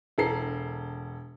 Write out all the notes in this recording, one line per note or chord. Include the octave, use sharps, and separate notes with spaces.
E1 E4 A4 A#5 C7